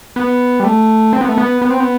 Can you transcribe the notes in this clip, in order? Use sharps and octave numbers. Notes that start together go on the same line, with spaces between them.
B3
G3
A3
C4
B3
A3
B3
B3
C4
B3